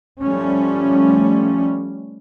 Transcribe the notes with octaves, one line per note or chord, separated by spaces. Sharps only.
F3 G3 A3 C#4